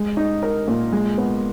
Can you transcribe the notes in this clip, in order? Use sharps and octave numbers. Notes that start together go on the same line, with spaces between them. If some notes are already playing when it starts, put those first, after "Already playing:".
Already playing: G#3
D#4
A#4
A#2
G#3
B3